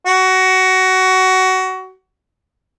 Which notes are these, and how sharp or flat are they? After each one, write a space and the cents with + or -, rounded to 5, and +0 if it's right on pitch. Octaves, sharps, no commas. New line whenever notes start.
F#4 +20